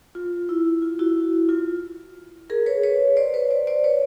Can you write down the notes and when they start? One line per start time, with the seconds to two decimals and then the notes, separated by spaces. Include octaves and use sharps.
0.15 F4
0.49 E4
0.82 F4
0.99 E4 F#4
1.49 F4
2.50 G#4 A#4
2.66 B4 C#5
2.83 B4 C#5
3.17 C5 D5
3.34 B4 C#5
3.50 C5 D5
3.67 C5 D5
3.84 B4 C#5